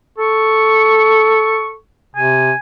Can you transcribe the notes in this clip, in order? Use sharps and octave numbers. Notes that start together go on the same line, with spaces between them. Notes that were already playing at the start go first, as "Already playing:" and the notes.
A4 C#6
C3 G#5